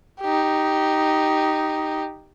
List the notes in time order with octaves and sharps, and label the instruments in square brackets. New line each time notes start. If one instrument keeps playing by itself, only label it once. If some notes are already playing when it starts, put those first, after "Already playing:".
[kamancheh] D#4 G4